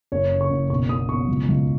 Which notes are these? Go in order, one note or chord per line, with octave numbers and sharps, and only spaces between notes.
F#1 C#5
C#3
C#6
F#1
B1 C#6
B2 D#6
B1 C#6
C#2
C#2